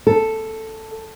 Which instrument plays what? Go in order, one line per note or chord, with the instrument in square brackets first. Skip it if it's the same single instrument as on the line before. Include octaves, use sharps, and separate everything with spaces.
[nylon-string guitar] A4